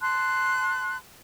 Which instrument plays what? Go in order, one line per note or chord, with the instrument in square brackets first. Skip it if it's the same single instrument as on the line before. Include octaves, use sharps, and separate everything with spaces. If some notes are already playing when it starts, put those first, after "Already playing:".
[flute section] A5 C6 F#6